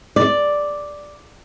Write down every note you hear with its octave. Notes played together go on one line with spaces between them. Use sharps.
D5